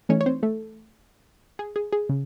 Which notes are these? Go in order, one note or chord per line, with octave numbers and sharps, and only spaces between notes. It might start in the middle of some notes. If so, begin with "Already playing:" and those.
E3 A3 C#4 D#4 C#5
C#5
C4 C5
A3 A4
G#4
G#4
G#4
C#3